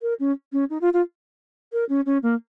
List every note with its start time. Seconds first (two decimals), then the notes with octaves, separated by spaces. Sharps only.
0.02 A#4
0.20 C#4
0.53 C#4
0.70 D#4
0.81 F4
0.93 F4
1.73 A#4
1.89 C#4
2.06 C#4
2.23 A#3